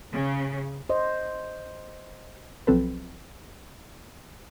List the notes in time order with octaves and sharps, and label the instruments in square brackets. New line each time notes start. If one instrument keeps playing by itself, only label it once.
[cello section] C#3
[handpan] C5 D#5
[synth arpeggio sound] B1 F3 F#3 C4 A4 B4